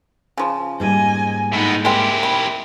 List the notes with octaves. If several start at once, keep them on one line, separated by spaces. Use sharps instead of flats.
C#3 F3
G#2 G3 A#3 D#5 G#5
A2 G#3 B3 D#4
G#3 C4 E4 G4 A#4
B5